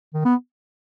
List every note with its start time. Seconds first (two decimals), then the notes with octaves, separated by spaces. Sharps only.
0.14 D#3
0.25 B3